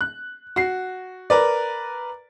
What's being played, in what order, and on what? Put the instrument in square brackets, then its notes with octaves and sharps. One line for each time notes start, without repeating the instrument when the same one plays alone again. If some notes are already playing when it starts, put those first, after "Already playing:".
[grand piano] F#6
F#4 C7
A#4 B4 D5